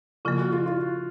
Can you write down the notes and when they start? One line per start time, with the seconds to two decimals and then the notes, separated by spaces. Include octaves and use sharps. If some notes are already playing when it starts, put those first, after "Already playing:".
0.25 C#3 F3 A#3 F4
0.38 F#4
0.52 F4
0.66 F4